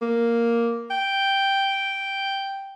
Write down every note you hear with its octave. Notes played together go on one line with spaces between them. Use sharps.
A#3
G5